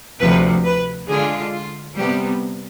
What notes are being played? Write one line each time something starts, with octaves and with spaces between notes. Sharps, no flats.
D2 C3 F3 B4
B4
D3 G#3 D4 F4 G#4
F4
C3 G3 B3 G4